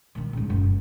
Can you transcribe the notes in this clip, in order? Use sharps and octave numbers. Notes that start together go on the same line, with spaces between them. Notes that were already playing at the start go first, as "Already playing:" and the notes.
A#2 D#3
G#2 C#3
F#1 F#2